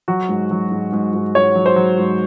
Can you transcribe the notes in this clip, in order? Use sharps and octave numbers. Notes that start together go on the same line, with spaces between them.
F#3 F#4
G#2
F#3
G#2
G#2
G#2
G#2 C#5
F#3
C5
F#3
G#2